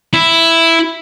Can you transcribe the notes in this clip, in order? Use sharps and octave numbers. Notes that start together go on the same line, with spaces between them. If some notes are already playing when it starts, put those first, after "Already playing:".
E4